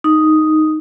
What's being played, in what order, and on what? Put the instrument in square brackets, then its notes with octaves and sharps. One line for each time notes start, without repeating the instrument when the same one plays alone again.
[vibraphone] D#4